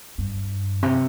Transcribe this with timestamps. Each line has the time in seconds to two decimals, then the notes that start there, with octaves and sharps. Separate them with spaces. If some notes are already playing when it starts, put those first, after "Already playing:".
0.18 G2
0.83 C3